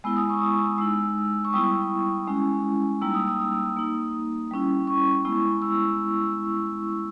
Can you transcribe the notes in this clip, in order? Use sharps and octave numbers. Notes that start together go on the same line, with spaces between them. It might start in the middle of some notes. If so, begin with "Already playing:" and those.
G#3 B3 E4 E6
D#6
C#6
D#6
G#3 D#4 E6
C#6
G3 B3 E4 D#6
G#3 C#4 E4
G3 A#3 D#4 E6
D#6
D#6
D#6
A#3 D#4
G3 C#4 E4
C#6
G#3 B3 E4
E6